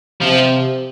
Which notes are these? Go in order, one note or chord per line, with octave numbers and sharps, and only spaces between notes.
C3 F3